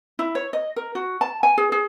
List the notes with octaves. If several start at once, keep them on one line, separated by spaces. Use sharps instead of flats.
E4
C#5
D#5
A#4
F#4
A5
G#5
G#4
G#4